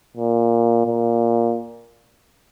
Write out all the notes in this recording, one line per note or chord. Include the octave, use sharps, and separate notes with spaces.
A#2
A#2